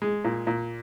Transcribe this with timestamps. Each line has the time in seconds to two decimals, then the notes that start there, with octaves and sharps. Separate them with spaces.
0.02 G#3
0.25 A#2
0.47 A#2